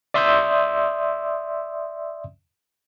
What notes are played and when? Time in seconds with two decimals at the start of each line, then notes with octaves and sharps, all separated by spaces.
0.14 D5 E5 C6 D#6 E6 G6